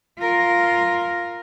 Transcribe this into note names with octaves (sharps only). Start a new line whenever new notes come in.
F4 A#4